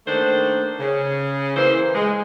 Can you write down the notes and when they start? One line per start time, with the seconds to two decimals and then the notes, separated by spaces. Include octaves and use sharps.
0.06 D#3 A3 A#3 D4 C5
0.79 C#3
1.55 E3 A#3 C5
1.95 G#3